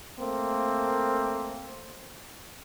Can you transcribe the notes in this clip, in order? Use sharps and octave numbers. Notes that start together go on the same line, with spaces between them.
A3 A#3 C4